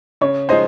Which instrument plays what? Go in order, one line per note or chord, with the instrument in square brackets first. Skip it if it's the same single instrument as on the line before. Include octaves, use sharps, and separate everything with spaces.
[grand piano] C#3 [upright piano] C#5
[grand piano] F3 G#3 D#4 [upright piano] C5 D#5